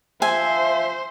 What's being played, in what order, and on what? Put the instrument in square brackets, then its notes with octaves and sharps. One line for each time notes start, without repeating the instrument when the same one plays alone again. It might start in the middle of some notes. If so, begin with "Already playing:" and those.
[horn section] F3 E5 [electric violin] C5 [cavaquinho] G#5